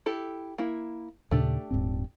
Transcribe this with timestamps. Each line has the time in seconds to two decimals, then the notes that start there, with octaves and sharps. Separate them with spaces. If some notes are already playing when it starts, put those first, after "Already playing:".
0.06 E4 G4 A4
0.58 A#3 E4
1.31 D#2 A#2 C#3 A3 D4 G4
1.71 D#1 G#2 C4